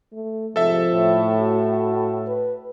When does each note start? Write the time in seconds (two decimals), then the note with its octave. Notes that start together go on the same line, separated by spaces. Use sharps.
0.13 A3
0.56 F2 G#2 C3 F3 A4 E5
0.93 A2
1.40 F#4
2.27 B4